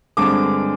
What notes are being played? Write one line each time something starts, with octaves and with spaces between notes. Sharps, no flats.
G2 D3 G#3 C4 D6